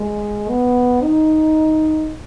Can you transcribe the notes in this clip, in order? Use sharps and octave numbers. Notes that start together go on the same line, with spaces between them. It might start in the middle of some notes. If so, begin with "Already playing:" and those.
Already playing: G#3
B3
D#4